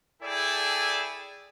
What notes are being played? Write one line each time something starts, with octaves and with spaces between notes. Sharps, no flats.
E4 G#4 A4 D5 G5 G#5